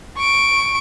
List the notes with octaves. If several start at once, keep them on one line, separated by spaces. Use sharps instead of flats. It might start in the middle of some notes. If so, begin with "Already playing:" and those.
C#6 D7